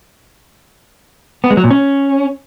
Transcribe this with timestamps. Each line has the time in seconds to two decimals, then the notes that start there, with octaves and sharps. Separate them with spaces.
1.44 B3
1.50 G#3
1.57 F#3
1.64 A#2
1.71 C#4